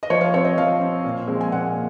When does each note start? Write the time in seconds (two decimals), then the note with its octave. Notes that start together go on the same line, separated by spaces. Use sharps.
0.03 D#5
0.10 F3 C#5
0.21 F5
0.34 C4 C#5
0.45 D#5
0.57 F3 F5
0.81 C4
1.04 A#2
1.27 F3 G#3 C4
1.41 G#5
1.52 A#2 F#5